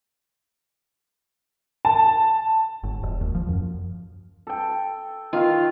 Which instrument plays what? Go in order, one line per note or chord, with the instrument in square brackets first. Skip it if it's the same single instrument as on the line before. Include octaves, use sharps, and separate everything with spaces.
[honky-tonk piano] A5
[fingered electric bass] G1
E1
D#2
F3
F#2
[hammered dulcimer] A4 G5
[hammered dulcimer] D#3 F5 [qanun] F4